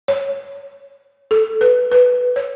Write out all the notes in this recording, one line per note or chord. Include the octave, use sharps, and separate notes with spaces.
C#5
A4
B4
B4
C#5